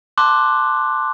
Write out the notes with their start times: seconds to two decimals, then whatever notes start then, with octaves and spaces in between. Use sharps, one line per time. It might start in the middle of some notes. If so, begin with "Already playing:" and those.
0.18 A5 C6 D6 F#6